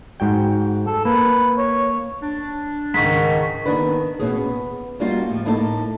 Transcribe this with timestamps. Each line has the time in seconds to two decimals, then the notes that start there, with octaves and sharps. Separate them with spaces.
0.20 G#2 F#4 G5
0.87 A4
1.05 A#3 B4
1.58 C#5
2.22 D4
2.94 C#2 G#2 D#3 C#6 B6
3.65 D#2 D#3 B3 D4 B4
4.19 B2 E3 A#3 C#4 G#4
4.35 B3
5.00 G3 A#3 D4 D#4 F4 F#4
5.29 A2 F3
5.45 A2 A#3 D#4 A4 D5 A5